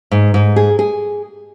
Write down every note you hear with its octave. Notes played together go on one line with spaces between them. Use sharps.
G#2
G#2
G#4
G#4